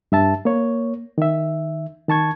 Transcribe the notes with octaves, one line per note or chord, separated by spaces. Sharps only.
G2 E5 A5
A#3 C#5
D#3 E5
D#3 A5 C#6 G#6